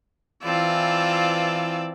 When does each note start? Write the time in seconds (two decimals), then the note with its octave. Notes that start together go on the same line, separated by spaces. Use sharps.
0.44 E3 C4 F4 D5 A5 E6